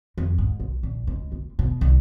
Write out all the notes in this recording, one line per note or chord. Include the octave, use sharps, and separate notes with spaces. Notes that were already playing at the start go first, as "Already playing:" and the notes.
F2
G#2
B1
A#1
C#2
F#1
B2
C2